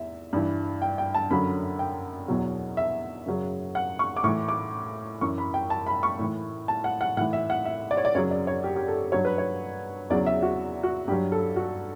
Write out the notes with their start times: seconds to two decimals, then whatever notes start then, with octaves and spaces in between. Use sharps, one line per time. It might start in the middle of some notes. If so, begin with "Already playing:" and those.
Already playing: E2 E5
0.33 G2 E3
0.82 G5
0.98 G5
1.15 A5
1.31 F#2 D3 F#3 B5
1.79 G5
2.28 E2 B2 F#3
2.77 E5
3.26 F#2 C#3 F#3
3.75 F#5
3.99 C#6
4.17 D6
4.24 A2 C#6
4.28 E3
4.49 D6
5.21 F#2 E3 C#6
5.38 B5
5.54 G5
5.70 A5
5.87 B5
6.03 C#6
6.19 A2 E3
6.68 A5
6.84 F#5
7.01 F#5
7.17 A2 F#5
7.21 E3
7.33 E5
7.50 F#5
7.65 E5
7.91 D5
7.97 C#5
8.05 D5
8.15 F#2 C#3 F#3 C#5
8.31 D5
8.47 C#5
8.64 G4
8.76 G4
8.88 A4
9.12 G2 F#3 C#5
9.25 B4
9.38 C#5
10.10 E2 C#3 F#3 D5
10.27 E5
10.43 F#4
10.83 F#4
11.08 G2 G4
11.12 F#3
11.32 A4
11.56 F#4